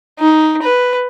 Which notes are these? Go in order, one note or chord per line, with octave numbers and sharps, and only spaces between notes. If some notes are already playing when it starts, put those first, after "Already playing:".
D#4
B4